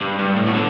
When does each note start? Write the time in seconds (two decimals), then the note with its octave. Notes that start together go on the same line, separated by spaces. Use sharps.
0.01 G2
0.19 G2
0.36 A2
0.46 B2
0.54 D3